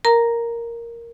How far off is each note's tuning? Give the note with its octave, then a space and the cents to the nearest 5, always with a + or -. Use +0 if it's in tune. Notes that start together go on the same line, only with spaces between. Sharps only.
A#4 +0 A#5 +0